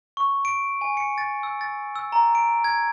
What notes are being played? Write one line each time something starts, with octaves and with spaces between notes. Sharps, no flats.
C#6
D7
G#5
C#7
A6
E6
A6
E6
A#5
D7
G#6